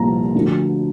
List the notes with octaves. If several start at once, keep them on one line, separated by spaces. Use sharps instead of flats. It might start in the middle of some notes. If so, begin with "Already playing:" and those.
Already playing: C2 A#2 F3 A#5
D2 D3 F3